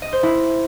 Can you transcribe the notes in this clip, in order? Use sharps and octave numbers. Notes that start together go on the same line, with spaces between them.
D#5
C5
E4